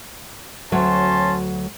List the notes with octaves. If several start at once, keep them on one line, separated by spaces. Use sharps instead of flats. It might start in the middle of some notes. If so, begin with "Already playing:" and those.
D2 F#3 C#4 C#5 A5 C6